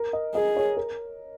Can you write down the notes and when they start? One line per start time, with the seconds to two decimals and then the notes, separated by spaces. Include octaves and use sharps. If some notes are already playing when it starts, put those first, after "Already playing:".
Already playing: A#4
0.13 D#5
0.35 G#4 D#5
0.57 C#5
0.77 A#4